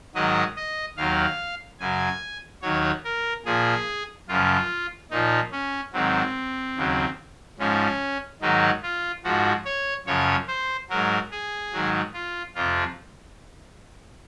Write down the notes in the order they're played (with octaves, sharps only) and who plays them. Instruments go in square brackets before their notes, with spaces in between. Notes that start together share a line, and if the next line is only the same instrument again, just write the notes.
[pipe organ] G#2 D#3 F#3 D#5
D#5
D#2 D#3 F#3 F5
F#2 C#3 F#3 G#5
D#2 D#3 F#3 C#5
A#4
A#2 F3 G#4
F#2 C#3 F3 F4
A#2 F3 D#4
C#4
G#2 D#3 F#3 C4
D#2 C#3 F#3
G#2 F3 C#4
G#2 D#3 F#3 D#4
F4
G#2 F3 F#4
C#5
F#2 C#3 F3 C#5
C5
G#2 F#3 A#4
G#4
G#2 D#3 F#3
F4
F2 C3 F3 F4